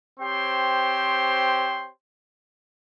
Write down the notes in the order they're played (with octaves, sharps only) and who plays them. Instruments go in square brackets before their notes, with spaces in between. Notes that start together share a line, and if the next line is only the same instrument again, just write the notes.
[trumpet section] C4 G4 C5 C#5 G5 C6